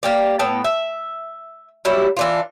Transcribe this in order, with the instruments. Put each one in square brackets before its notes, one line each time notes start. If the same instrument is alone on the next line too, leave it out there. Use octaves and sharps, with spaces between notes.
[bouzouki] A#3 G4 D5
A2 B3 G5 A5
E5
F#3 G3 E4
E3 D4 F4